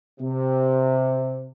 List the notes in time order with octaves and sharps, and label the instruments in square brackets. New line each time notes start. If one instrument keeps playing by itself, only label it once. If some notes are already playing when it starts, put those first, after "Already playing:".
[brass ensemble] C3